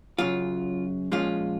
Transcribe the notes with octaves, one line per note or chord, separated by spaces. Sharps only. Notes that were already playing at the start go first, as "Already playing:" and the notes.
F#2 C#3 F#3 F4
A#2 F3 G#3 C#4 F4